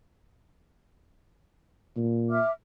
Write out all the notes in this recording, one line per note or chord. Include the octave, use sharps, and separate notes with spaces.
A#2
E5 D6 F6